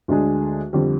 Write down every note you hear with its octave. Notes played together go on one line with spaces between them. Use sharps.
D2 D3 G#3 D4 G#4
F2 D3 G3